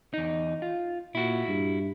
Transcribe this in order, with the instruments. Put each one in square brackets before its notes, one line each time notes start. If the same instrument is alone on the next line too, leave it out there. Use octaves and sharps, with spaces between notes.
[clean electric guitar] E2 D#4
F4
[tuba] A#2 [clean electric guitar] E4 F#4
[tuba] G2